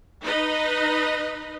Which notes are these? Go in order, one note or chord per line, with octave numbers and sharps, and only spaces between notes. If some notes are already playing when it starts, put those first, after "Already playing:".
D#4 B4 D#5